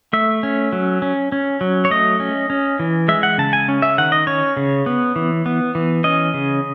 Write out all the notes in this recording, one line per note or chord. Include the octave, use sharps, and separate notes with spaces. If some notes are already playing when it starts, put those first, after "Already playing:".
A3 E5
C#4
F#3
C#4
C#4
F#3
C#5
A3 D#5
C#4
C#4
E3
G#3 E5
F#5
C#3 A5
G#5
C#4
E5
D#3 F#5
D#5
C#4 C#5
C#3
B3
E3
B3
E3
C#4 D#5
C#3